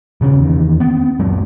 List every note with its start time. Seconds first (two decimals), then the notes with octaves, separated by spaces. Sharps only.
0.21 D#1 C#3 B3 C#4
0.39 E2 D#3
0.80 B3 C4
1.19 F#2 F#3 G#3